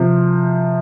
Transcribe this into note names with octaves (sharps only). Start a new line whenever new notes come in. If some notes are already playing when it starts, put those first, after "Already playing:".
Already playing: C3 F3